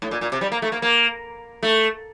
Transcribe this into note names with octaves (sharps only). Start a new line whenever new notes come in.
A2
A#2
A#2
C3
G3
A#3
A3
A#3
A#3
A3